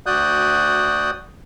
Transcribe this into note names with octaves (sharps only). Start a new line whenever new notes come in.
D2 F#4 D5 D#6 F#6 G6